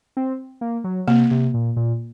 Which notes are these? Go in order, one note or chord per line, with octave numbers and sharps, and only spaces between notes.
C4
A#3
F#3
C3 A#3
C3
A#2
A#2